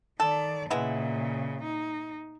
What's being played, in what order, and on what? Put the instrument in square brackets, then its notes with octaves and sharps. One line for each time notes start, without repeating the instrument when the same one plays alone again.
[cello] D#3 D5 [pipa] A4
[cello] A#2 C#3 [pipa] G#3 B3 E4
[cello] D#4